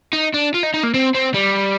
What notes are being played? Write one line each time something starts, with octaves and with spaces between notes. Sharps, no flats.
D#4
D4
F4
D#4
D#4
A#3
C4
C4
G3